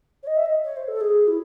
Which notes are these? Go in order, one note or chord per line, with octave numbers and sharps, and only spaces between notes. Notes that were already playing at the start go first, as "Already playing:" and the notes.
C#5
D#5
E5
D#5
C#5
C5
A4
G#4
E4